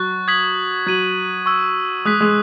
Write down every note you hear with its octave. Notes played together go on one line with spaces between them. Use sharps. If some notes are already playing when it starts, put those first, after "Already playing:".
Already playing: F#3 C#6 F#6 A6
D#6 G#6 B6 F#7
F#3 G#6 D#7 F#7
C#6 E6 G#6
G#3 D#6 F#6 B6
G#3